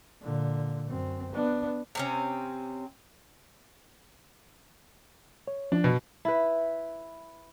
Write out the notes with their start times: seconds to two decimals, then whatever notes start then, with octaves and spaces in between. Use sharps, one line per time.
0.22 A#2 D3
0.87 F#2 C4
1.32 B3 D4
1.95 C3 C4 C#4
5.48 C#5
5.72 F3 D4
5.84 B2
6.25 E4 B4